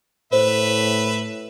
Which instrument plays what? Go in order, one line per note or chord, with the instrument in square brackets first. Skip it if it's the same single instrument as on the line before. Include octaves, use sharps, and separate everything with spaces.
[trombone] A2 [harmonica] B4 E5 [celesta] C5